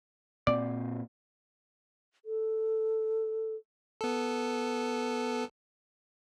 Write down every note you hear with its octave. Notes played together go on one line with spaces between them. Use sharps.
A#2 C4 D5
A4
B3 A4